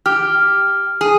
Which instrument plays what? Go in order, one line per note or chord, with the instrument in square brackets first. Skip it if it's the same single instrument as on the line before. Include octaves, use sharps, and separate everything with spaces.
[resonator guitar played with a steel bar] G4 [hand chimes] F6
[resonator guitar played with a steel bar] G#4